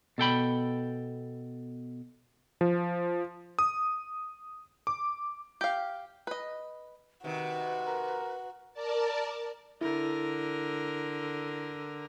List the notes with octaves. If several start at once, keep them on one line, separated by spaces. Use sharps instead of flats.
B2 A4 G5 B5
F3
D#6
D6
G4 F5
B4 D#5
C3 D#3 F#4 B4
A#4
A#4 D5 A5
D3 E4 A#4